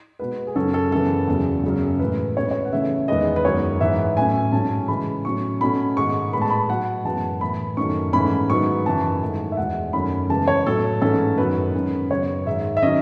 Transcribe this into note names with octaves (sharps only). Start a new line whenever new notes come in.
B2 G#3 B3 B4
G#4
F#2 C#3 F#3 C#4 A4
A4
F#2 C#3 E3 B3 A4
E2 C#3 F#3
F#2 C#3 F#3
A2 E3 G#3 B4
B2 G#3 C#4 C#5
B4
C#5
F#5
C#3 E3 A3 C#4 E5
E2 D#3 G#3 B3 D#5
B4
F#2 D#3 G#3 B3 C#5
G#2 E3 B3 E5
A2 F#3 C#4 G#5
G#2 F#3 A3 C#4 A5
C#3 E3 G#3 B5
A2 F#3 C#4 C#6
B2 A3 C#4 B5
G#2 D#3 G#3 C#6
A2 G#3 B3 B5
A5
B5
B2 F#3 B3 F#5
F#2 E3 G#3 B3 A5
A2 E3 B3 B5
F#2 D#3 A3 C#4 C#6
G#2 E3 A3 C#4 B5
G#2 D#3 F#3 B3 C#6
F#2 C#3 E3 A5
G#2 D#3 A3
E5
E2 B2 G#3 F#5
F#2 D#3 A3 C#4 B5
C#3 E3 G#3 B3 A5
C#5
A2 F#3 A3 A4
G#2 E3 A3 C#4 A4
F#2 D#3 F#3 B3 B4
F#2 D#3 G#3 C#4
F#2 C#3 F#3 B3 C#5
G#2 D#3 G#3 E5
E5
D#3 F#3 C#4 D#5